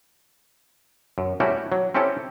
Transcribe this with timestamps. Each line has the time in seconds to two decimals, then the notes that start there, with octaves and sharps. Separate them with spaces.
1.18 F#2
1.40 G3 A3 C#4 E4 F#4 G4
1.72 F#3
1.95 C4 C#4 E4 G4 A4